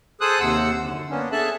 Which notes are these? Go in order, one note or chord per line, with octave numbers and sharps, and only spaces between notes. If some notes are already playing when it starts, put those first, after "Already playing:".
G#4 A4 C5 D#6 F#6
D#2 C3 C5 F#5 E6
F#2 D3
A#3 B3 C#4 D4
G#4 A4 E5 A5 F#6